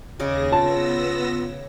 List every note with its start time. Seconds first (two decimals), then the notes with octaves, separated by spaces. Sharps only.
0.19 D#2 C#3 G#4 D#5 D6 A#6
0.52 B3 F4 A5 E6 A#6